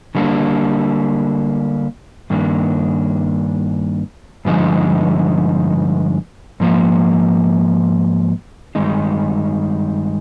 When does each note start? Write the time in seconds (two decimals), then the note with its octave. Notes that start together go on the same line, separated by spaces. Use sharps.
0.15 D3 G3 A#3 D4
2.30 G2 D#3 A#3 D4
4.45 G2 D3 F3 G#3 D#4
6.60 G#2 F3 A#3
8.75 G2 D#3 G#3 D#4